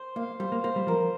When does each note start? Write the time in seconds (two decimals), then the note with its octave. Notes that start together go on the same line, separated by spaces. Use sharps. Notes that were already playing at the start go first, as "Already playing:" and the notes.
Already playing: C5
0.16 A#3 F5
0.40 G3 C5
0.52 A#3
0.64 A#3 C5
0.76 G3
0.87 F3 A#4